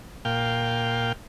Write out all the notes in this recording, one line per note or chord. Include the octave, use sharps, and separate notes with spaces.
A#2 F5 G5